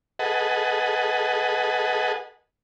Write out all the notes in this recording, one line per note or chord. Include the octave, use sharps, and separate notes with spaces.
G#4 A4 B4 D#5 F#5